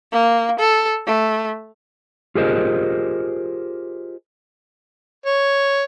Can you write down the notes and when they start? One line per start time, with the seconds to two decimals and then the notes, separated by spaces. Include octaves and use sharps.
0.12 A#3
0.59 A4
1.07 A3
2.35 F4 G4 G#4 A#4 C5 D#5
5.26 C#5